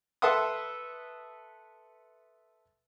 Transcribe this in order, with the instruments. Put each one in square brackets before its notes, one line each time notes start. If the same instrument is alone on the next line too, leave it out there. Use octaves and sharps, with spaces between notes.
[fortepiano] A4 B4 E5 F#5 C6 D#6